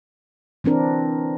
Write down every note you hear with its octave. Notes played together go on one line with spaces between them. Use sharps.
E3 C4 D4 A#4